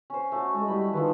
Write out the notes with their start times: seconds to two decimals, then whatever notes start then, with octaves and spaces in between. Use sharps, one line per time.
0.10 C#4 C5
0.32 A3 C#4 F#4
0.54 G#3 A4 D#5
0.68 G3 E4 B5
0.93 D#3 F3 A4 B4